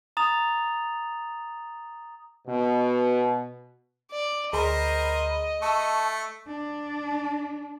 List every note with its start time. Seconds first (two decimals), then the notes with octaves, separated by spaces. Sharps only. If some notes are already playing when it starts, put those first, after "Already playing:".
0.17 A#5 D#6 A6 F7
2.48 B2
4.11 D5
4.53 D2 G#4 A#4 C5 D#5 B5
5.62 A3 A5 C#6 E6
6.47 D4